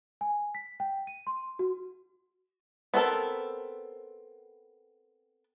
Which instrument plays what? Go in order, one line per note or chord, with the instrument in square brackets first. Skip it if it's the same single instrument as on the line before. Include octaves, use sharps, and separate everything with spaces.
[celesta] G#5
B6
G5
D#7
C6
F#4
[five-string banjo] B3 C4 A4 A#4